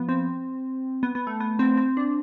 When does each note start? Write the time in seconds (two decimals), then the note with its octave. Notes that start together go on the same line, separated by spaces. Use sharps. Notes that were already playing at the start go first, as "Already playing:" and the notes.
Already playing: F3 B3
0.09 C4
1.03 B3
1.15 B3
1.27 A3
1.40 B3
1.59 C4
1.77 C4
1.97 D4